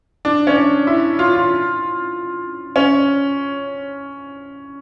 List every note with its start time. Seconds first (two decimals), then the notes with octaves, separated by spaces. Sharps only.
0.25 D4
0.47 C#4
0.56 D4
0.87 E4
1.19 F4
1.35 F4
2.76 C#4